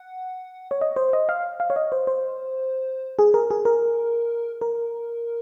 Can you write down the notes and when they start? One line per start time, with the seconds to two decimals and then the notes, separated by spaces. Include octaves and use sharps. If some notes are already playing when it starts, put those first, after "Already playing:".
Already playing: F#5
0.71 C#5
0.81 D#5
0.96 C5
1.13 D#5
1.29 F5
1.60 F5
1.70 C#5
1.76 D#5
1.92 C5
2.07 C5
3.19 G#4
3.34 A#4
3.51 G#4
3.65 A#4
4.61 A#4